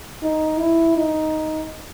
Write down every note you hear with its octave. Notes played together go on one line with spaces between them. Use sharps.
D#4
E4
D#4